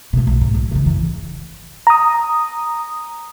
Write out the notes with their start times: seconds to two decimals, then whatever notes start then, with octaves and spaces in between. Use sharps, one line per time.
0.13 B2 G#3
0.27 B1
0.41 G#2
0.54 B1
0.71 C#3 E3
0.86 F#2 E3
1.87 A#5 D#6